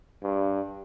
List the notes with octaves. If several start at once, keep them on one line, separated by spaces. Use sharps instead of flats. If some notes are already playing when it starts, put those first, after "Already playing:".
G2